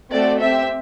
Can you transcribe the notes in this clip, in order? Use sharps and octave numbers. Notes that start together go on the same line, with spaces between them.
A3 C4 F#4 A4 D5
C4 G4 E5